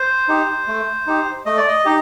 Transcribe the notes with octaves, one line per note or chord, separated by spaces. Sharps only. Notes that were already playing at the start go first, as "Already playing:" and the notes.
Already playing: C5
D#4 G4
A3
D#4 G4
A3 D#5
D5
D#5
D#4 G4